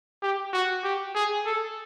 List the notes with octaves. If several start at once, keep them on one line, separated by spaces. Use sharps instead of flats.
G4
F#4
G4
G#4
A4